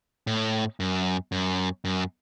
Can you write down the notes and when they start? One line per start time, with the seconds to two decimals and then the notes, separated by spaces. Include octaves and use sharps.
0.27 A2
0.80 F#2
1.32 F#2
1.85 F#2